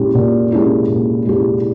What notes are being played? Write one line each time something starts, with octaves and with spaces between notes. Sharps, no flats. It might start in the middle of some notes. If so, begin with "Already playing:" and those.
Already playing: A#2 G#3 C#4 E4 G4
A#2
G#3 C#4 E4 G4
A#2
G#3 C#4 E4 G4